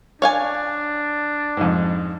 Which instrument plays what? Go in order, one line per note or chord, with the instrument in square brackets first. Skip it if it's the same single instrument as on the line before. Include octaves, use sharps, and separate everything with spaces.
[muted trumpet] D4 [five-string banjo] C#5 F5 G#5
[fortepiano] F2 G#2